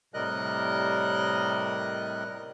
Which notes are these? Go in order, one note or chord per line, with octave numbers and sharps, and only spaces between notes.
A2 C3 G3 A#4 D#5 F#6